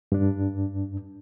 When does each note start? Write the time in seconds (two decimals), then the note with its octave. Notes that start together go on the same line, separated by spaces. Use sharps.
0.12 G2 D4